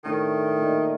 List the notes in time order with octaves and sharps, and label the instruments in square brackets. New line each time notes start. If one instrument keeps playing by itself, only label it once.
[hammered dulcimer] A2 A3 D4 [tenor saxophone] D#3
[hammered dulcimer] A#2 A3 D#4